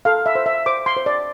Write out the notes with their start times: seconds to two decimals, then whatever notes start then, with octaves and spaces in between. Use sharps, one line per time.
0.05 A4 F5
0.26 E5
0.35 C5
0.46 E5
0.66 C5 D6
0.86 C6
0.96 C5
1.06 D5